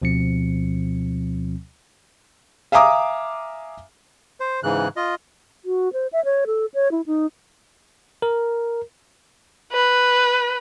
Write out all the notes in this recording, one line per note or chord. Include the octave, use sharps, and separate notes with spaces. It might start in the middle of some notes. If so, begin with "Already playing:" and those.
D2 B2 F3 C4 C#7
E5 F5 G#5 A#5 D6 D#6
C5
G#2 C#3 E3 F#6
F4 D#5
F#4
C5
E5
C#5
A4
C#5
E4
D#4
A#4
B4